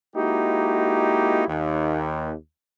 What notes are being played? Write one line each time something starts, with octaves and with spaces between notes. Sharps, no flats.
G#3 A#3 D#4 E4 F#4 G4
D#2 D#3